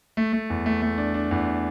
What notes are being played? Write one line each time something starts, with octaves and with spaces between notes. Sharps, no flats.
A3
A3
E2
A3
A3
D4
D4
E2